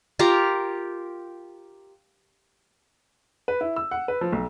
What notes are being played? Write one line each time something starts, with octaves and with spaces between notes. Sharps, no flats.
F4 G4 A#4 A#5
B4
E4
E6
F#5
B4
F3
B1